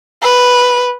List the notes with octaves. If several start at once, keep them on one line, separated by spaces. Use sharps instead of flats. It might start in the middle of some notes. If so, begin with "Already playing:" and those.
B4